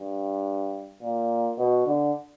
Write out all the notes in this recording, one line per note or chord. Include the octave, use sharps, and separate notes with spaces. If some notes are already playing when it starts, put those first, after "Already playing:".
Already playing: G2
A#2
B2
D3